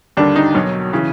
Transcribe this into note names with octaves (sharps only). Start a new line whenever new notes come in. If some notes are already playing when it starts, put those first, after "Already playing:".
D#2 D3 G3 D4
D#4
B1 B2 F#3
C#3 E3